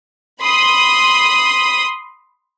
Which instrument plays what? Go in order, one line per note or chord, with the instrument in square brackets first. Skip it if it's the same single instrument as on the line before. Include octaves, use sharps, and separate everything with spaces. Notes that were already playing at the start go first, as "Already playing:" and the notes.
[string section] B5 C6 D#6